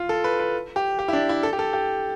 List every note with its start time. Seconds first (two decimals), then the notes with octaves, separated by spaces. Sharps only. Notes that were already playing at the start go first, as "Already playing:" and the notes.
Already playing: F4
0.09 A4
0.24 B4
0.39 B4
0.76 G4
0.99 G4
1.08 E4
1.13 D4
1.29 E4
1.43 A4
1.53 G4
1.59 A4
1.73 G4